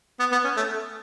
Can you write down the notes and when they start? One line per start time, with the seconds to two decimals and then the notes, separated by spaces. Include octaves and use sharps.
0.19 B3
0.32 B3
0.44 C#4
0.57 A3